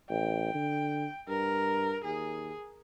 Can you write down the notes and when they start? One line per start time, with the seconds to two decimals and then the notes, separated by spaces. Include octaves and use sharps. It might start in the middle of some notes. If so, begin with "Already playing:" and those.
0.10 A1 G5
0.54 D3
1.28 G2 A#4
2.04 D#2 G#4